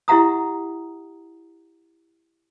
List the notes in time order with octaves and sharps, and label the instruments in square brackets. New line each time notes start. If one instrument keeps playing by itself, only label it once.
[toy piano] E4 G4 E5 F#5 A#5 D#6